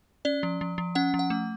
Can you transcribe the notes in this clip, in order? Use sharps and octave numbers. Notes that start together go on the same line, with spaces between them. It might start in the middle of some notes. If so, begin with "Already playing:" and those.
C#4 D5
F3
F3
F3
C#4 F#5
F3
F#5
A3